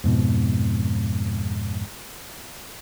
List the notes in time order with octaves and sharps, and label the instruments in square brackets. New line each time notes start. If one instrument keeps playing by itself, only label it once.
[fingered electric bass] F2 G#2 B2